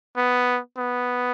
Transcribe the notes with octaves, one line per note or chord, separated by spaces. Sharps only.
B3
B3